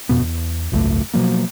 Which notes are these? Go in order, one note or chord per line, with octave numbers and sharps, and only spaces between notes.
F2 B2 B3
E2
G#1 C#2 F#2 A3
B2 F3 F#3 A#3